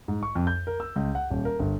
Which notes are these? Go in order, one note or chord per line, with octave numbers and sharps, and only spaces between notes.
G#2
C#6
F2
G6
A#4
E6
C#2
F#5
D#1
A#4
G1